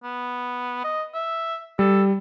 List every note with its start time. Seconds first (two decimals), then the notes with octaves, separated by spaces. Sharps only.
0.03 B3
0.84 D#5
1.14 E5
1.79 G3 A4